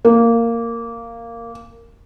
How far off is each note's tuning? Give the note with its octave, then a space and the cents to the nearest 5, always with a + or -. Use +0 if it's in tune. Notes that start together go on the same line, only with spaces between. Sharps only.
A#3 -10